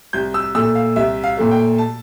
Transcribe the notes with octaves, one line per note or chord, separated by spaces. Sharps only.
C2 G6
E6
A#2 A3 E6
F5
C2 E5
F5
A#2 A3
G5
A5